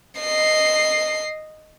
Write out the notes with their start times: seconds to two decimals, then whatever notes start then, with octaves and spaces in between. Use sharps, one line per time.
0.19 D#5 C7